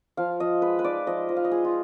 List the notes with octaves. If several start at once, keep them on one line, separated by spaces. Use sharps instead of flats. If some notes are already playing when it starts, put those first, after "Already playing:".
F3 F5
F3 D#5
G#3 B4
B4
D#4 D5
F3 D#5
F3 D#5
F5
D#5
G#3 G#4
F4